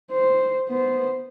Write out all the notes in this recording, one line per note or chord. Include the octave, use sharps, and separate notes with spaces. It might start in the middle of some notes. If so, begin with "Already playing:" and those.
C5
B3 C5